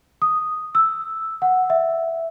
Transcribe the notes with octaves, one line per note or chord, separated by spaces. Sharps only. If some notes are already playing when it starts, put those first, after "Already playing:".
D#6
E6
F#5
E5